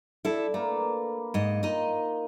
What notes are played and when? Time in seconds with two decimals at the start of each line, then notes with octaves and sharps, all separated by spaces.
0.25 D4 E4 A4
0.54 A3 A#3 A#4 B4
1.34 G#2 D#5
1.63 D#4 F4 A#4 D#5